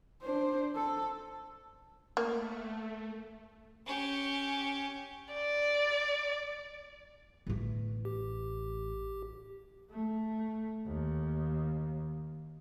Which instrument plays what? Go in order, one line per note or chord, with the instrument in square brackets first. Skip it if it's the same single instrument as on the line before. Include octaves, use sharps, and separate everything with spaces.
[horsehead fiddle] D4 C5
A4
[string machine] A3 [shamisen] A#3
[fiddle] C#4 G4
[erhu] D5
[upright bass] A1 A3
[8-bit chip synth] G4
[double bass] A3
D#2